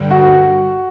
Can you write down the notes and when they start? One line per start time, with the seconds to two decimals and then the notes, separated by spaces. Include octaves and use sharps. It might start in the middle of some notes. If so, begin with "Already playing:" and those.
Already playing: G2 D3 G3
0.11 F#4